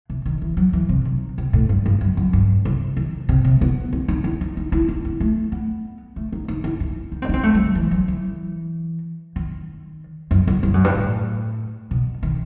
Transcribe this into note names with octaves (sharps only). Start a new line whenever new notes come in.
C3
D#3
E3
F#3
E3
C3
D#3
C3
A2
G2
G2
F#2
F#2
G2
C3
D#3
C3
C3
B3
C4
D#4
E4
D#4
D#4
E4
D#4
B3
A3
B3
A3
D#4
D#4
E4
D#4
D#4
C4
D#4
C4
A3
G3
F#3
E3
F#3
E3
D#3
F#2
F#2
G2
F#2
G2
A2
B2
D#3